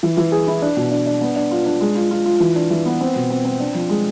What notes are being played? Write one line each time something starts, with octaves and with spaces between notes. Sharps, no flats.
E3
E3
G#4
E4
D4
B2
D4
D4
B3
D4
F4
D4
G#3
F4
F4
F4
E3
D4
E3
B3
C4
B2
C4
C4
D4
F3
G#3